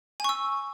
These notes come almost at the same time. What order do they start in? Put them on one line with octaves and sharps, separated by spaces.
G#5 C#6 E6